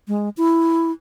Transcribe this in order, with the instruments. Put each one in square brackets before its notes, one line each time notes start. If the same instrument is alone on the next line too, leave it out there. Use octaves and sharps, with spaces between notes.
[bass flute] G#3
E4